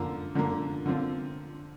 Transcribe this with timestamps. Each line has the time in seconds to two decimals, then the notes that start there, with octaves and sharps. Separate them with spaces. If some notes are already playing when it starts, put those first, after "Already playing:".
Already playing: D3 F3 A#3
0.35 D3 F3 A#3
0.86 D3 F3 C4 F4